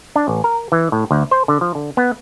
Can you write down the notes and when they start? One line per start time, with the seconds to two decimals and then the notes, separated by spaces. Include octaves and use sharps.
0.16 D4
0.28 A1
0.44 A#4
0.72 E3
0.92 A2
1.11 D2
1.31 C5
1.48 D3
1.61 F3
1.75 D3
1.97 B3